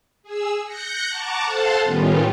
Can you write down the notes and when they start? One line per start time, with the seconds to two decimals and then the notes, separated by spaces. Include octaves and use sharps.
0.23 G#4 E6
0.64 F#6 G6 A#6 C#7
1.09 F#5 A5 A#5 C#6 D6
1.45 A4 C5 F5 F#5 A5 C6
1.83 A2 D#3 G3 B3 C#4 F4